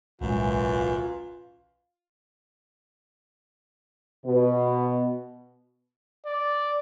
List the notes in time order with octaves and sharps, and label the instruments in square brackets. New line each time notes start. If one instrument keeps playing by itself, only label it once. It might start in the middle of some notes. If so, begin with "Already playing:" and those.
[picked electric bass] D1 B1 G#3 [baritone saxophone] F#2 [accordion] E3 [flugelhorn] F4
[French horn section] B2
[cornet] D5